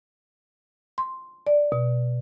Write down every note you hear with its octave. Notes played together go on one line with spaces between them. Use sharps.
C6
D5
B2